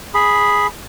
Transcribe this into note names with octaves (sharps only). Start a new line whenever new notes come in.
G#4 B5